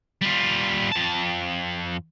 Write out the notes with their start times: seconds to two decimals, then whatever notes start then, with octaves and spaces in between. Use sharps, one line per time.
0.22 G3 F4
0.92 F2 A5